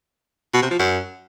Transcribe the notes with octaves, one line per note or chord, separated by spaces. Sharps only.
B2
C3
F3
F#2